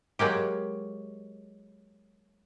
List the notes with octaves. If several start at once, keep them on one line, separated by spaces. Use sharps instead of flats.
F#3 G#3 A#3 G4